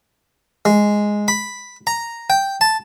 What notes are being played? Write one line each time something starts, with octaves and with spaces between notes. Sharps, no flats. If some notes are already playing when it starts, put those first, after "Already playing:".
G#3
B5
A#5
G5
A5